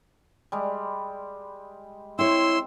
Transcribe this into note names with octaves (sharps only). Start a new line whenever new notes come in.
G3 G#3
C4 E4 C#5 C6 E6